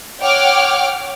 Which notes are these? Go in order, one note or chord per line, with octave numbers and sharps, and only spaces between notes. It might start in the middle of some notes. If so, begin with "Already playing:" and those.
C#5 F#5 G5 D6 F6